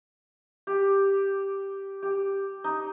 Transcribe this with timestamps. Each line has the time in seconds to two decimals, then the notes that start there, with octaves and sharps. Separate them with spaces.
0.67 G4
2.03 G4
2.64 D#4